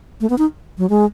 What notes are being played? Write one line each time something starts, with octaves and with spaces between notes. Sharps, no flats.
A3
B3
D#4
F#3
G#3